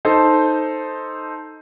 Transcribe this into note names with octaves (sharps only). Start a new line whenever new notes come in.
D#4 A4 C5